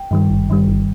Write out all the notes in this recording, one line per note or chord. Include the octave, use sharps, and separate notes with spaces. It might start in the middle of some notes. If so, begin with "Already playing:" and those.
Already playing: G5
G2 D#3 G3
G#1
G2 D#3 G3
G1